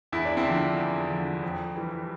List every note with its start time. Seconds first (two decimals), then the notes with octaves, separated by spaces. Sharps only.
0.12 E2 E4
0.25 D4
0.37 C4 E4
0.45 D3 F3
0.77 E2
1.10 D3 F3
1.43 F2
1.76 E3 G3